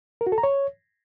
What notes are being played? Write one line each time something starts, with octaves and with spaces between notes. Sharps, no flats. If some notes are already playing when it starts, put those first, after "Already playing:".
A#4
F#4
A4
A#5
C#5